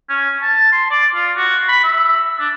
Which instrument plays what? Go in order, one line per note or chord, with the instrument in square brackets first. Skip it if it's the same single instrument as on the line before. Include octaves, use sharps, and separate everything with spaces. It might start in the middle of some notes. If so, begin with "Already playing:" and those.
[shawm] C#4
A5
C6
D5
F4
F#4
B5
E5
D4